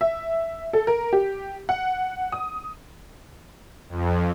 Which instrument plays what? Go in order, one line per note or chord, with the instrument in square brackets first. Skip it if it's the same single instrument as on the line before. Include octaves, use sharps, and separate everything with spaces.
[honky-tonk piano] E5
A4
A#4
G4
F#5
D#6
[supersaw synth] F2